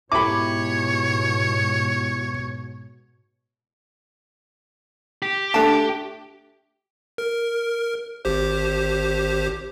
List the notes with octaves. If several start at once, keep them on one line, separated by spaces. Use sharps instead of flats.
G#2 B2 E4 G4 C#5 B5 D6
G4
A3 D4 A5
A#4
G#1 G4 C5